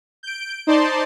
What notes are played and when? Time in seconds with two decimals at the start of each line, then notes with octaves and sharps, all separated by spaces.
0.23 G6 D7
0.67 D#4 C5 D5 A5 C6